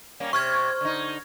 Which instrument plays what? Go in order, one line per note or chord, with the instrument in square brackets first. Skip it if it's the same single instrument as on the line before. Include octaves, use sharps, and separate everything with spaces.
[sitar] G3 A#3 C#4
[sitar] C3 [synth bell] C#6 F6 G#6
[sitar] D3 D#4